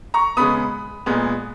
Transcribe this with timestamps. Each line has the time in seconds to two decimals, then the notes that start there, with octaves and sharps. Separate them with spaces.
0.14 A#5 C#6
0.37 C#3 G#3 B3 B5 D#6
1.06 A#2 G#3 B3